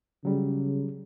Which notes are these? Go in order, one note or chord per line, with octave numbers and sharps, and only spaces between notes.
C#3 F#3 G3